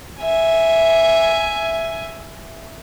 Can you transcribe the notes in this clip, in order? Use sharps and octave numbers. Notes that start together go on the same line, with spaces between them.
E5 G#5